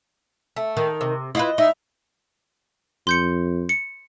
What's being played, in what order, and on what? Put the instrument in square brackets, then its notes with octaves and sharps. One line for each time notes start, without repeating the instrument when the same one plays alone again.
[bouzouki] A3
[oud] D#3
[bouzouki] C3
[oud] E4 F4 B4 [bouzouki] D#5
[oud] D#4 [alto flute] E5
[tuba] F2 [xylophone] C6 G6 C#7
[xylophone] C#7